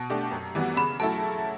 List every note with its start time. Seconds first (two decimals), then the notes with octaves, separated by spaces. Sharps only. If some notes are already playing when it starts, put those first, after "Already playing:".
Already playing: B2 A5
0.10 A3 D4 G4
0.31 F#2
0.55 E3 G3 B3 F#4
0.77 C#3 B5
1.00 F#3 A3 E4 A4 A5